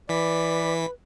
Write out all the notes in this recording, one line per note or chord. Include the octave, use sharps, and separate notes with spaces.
E3 B4 D5 B5 B6